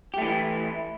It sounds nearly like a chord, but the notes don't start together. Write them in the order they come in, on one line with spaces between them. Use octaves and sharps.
G4 A3 E3 E4